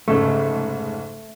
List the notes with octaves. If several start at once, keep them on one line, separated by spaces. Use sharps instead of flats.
F1 G#2 C#3 A3